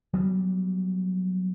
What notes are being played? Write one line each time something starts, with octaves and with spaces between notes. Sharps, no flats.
F#3 G3 B3